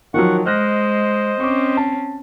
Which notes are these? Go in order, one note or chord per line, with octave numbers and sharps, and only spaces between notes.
D#3 F3 F#3 F#5 C#6
G#3 C5 D#5 F6 F#6 A#6
C4 C#4 C#6 D6
A5